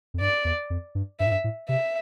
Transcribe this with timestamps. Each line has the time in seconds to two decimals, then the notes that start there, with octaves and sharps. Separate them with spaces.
0.14 F2
0.21 G2 D5
0.45 E2
0.70 F2
0.95 G2
1.20 G2 E5
1.26 A2
1.31 G2
1.44 A2
1.69 C3 E5